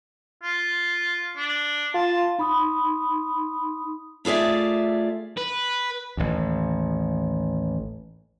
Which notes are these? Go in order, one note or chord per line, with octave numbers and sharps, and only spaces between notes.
F4
D4
F4 A5
D#4 B5 C6 D#6
A3 F4 G#4 D5 E5
B4
A1 D#2